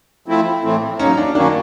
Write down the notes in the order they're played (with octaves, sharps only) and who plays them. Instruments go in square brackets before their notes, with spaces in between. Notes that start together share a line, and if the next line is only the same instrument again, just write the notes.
[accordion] F3 A3 C4 E4
A2 E3 A3 C4
[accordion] F#3 A#3 D#4 [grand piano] C#4
[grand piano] D4
[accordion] F#2 D#3 F#3 A#3 C#4 [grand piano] D4